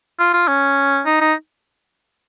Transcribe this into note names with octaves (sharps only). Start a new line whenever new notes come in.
F4
F4
C#4
D#4
D#4